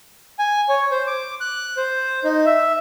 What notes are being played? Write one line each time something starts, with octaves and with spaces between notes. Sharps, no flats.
G#5
C#5
C5
D6
F#6
C5
D#4
E5